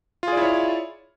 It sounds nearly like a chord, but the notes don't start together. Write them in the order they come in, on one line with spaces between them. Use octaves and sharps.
F4 G#4 D5 E4 C#5